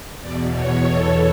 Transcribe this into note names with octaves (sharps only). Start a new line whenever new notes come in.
E2 B2 D5
C#5
A4